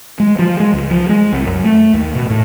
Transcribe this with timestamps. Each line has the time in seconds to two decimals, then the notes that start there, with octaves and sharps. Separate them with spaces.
0.20 G#3
0.39 F3
0.60 G#3
0.73 C#2
0.91 F3
1.09 G#3
1.32 C2
1.46 F#2
1.64 A3
1.94 D#2
2.15 B2
2.30 A2